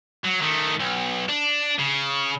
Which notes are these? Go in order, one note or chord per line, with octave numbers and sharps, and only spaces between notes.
F#3
D#3 A3
B1
D4
C#3